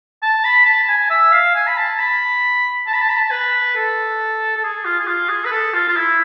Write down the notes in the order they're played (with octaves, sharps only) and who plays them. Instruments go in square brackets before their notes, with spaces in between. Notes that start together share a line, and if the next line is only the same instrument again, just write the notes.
[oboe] A5
B5
A5
A5
G#5
E5
F5
G#5
B5
A5
B5
A5
B5
A5
B5
A5
B4
A4
A4
G#4
F4
G#4
F4
G#4
B4
A4
F4
F4
E4